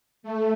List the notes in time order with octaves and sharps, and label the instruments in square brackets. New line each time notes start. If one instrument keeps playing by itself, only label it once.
[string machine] A3